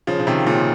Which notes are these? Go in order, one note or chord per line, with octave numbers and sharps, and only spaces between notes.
C#3 F3
C#3
C3 D#3
A#2 C#3